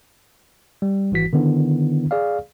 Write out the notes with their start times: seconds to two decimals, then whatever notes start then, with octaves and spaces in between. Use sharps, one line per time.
0.82 G3
1.12 G#1 E3 F#4 B6
1.33 D3 D#3 B3 D4 E4
2.11 G#4 D5 F5